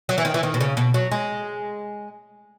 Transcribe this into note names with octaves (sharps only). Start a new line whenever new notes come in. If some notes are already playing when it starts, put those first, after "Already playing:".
F#3
E3
D#3
E3
D#3
B2
C#3
B2
F#3
G#3